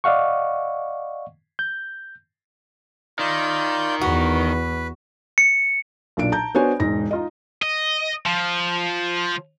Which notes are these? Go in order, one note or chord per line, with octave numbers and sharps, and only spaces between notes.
D5 D#5 F5 F#5 C#6
G6
D#3 F4 D5 G6
E2 F#4 B4
C#7
B1 A#2 D4 D7
A5 A#5 G6
B3 D4 F#4 C5 C#5 G#5
E1 G#2 A#6
D#4 F4 D#5
D#5
F3